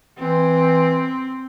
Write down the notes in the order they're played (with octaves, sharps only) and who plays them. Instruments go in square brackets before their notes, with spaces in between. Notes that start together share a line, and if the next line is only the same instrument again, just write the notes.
[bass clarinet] E3 [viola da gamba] C4